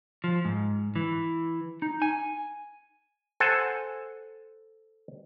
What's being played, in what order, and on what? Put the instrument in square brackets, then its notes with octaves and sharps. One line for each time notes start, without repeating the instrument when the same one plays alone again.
[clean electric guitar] F3
G#2
E3
D#4
G#5
[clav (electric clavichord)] A4 C5 F#5 G#5 A5